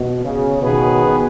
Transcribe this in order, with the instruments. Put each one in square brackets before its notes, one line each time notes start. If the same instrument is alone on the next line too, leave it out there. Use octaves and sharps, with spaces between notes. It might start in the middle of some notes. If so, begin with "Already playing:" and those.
Already playing: [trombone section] B2
C#3
[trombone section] B2 [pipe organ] D#3 B3 G#4 B4